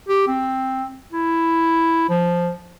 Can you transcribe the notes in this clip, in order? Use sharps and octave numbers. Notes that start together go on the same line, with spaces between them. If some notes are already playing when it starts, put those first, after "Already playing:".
G4
C4
E4
F3